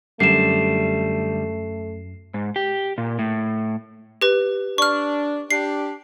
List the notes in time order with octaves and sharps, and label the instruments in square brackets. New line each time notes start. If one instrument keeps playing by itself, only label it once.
[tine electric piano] F#2 [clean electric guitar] D3 G3 [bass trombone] A3 [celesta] C7 E7
[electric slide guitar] G#2
G4
A#2
A2
[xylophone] G4 B4
[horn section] D4 [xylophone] C#6 F6
[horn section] D4 G4 [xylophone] C7